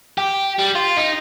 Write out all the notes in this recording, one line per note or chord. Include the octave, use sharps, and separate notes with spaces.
G4
G3
F4
D#4